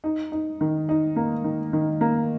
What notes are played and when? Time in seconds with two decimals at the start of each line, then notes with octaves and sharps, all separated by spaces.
0.04 D#4
0.32 D#4
0.61 D#3
0.89 D#4
1.16 A#3
1.44 D#3
1.73 D#3
2.01 A#3